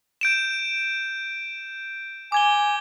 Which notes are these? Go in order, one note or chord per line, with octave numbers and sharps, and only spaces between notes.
G6 D7 E7
G#5 D6 G#6 G7